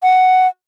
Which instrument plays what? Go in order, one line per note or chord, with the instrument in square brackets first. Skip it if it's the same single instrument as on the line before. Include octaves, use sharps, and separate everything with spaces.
[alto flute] F#5